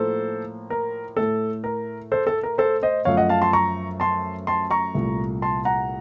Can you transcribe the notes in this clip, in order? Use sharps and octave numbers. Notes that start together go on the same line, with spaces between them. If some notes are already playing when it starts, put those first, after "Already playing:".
Already playing: A2 F3 A#3 A4 C5
A#4
A2 A3 A4
A#4
A4 C5
A4
A#4
A4 C5
C5 D#5
F#2 F3 A3 C#5 F5
D#5 F#5
F5 A5
A5 C6
A#5 C#6
A5 C6
A5 C6
A#5 C#6
C2 A#2 A3
A5 C6
F#5 A#5